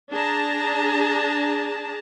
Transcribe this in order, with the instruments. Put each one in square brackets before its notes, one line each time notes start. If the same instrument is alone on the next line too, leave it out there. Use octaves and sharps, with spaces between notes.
[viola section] D4 G#4 A5 A#5